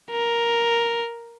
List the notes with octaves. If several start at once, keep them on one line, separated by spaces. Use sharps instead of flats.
A#4